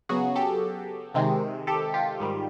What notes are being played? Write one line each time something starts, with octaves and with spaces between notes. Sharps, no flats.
C#3 F#3 B3 F#4 G#4
G4 A4
C3 D#3 G#3 C4
G4 A4
F4 G4
G#2 D#3 G3